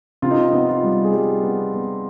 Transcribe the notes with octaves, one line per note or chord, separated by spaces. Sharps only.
C3 F4
D#4
B3 D#4
F4
G3
G#4
G3 G4
B3
B3